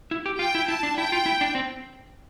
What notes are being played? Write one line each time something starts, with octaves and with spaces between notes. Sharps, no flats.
E4
G4
F4 G5
E4
E4 A5
D4
E4 G5
F4
E4
D4
C4